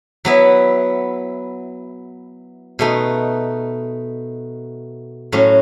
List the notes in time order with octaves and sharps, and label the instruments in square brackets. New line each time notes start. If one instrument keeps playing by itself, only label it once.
[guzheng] F#3 B3 E4
B2 A3 D#4
A2 F#3 C#4